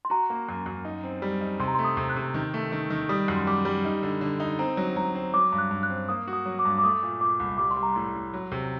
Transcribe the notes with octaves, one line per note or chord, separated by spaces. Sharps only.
C6
F#4 A#5
A#3
F#2
F#2
D#4
C4
G3
D#4
C3 C6
A#5
C6
A3
D#6
C3
F#6
C3
D#3
A3
D#3
D#3
G3 D#6
F#2
C6
G3 D6
G3
D#4
D3
D3
D#4
C4 A#5
F#3
F#3 A#5
C4
F#3 D6
G2
F#6
G2
F#6
C4
A#3 D#6
F#4
D#6
F#3
D6
G2
D6
A3 D#6
A#2
A#2 D6
C2
G3 D6
C6
G3
A#5
A2 C6
A2
F#3
C3